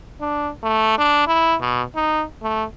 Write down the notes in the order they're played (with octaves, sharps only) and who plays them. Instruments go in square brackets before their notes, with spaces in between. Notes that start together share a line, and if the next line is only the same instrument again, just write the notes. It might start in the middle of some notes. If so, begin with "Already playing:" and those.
[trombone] D4
A3
D4
E4
B2
D#4
A3